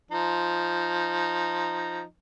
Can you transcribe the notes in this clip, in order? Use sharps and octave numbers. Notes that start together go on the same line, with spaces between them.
F3 D#4